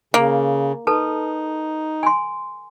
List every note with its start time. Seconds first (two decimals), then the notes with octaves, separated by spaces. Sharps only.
0.14 C#3 A#3
0.87 D#4 A4 B4 A5
2.03 G#5 C6